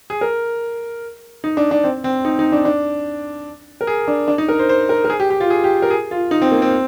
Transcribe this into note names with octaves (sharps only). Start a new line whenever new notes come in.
G#4
A#4
D#4
D4
D4
C4
C4
D#4
D#4
D4
D4
A#4
G#4
D4
D4
D#4
A#4
C5
C5
A#4
A#4
G#4
G4
G4
F4
G#4
G4
A#4
G#4
F4
D#4
C4
A#3
C4